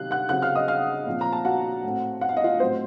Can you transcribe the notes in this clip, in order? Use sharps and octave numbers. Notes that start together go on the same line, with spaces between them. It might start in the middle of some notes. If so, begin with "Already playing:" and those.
Already playing: C3 D#3 F#3 F5 F#6
F#5 F#6
C#3 F#3 C4 F#5 F#6
F5 F6
D#5 D#6
F5 F6
A#2 F3 C4
A#5
A5
F#4 F#5
A2 A3 C4
F#5
F5
D#5
F4 F5
A2 F#3 C4 C5